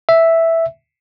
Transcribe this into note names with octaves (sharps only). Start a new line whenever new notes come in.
E5